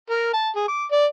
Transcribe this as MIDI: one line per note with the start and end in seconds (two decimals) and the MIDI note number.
0.10 0.32 70
0.33 0.49 81
0.56 0.64 68
0.68 0.84 86
0.92 1.05 74